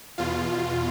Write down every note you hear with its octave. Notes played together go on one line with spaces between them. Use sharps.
E2 B2 F4